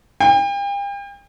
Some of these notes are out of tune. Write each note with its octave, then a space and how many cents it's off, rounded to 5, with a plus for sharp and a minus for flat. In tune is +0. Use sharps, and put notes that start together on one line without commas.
G5 +40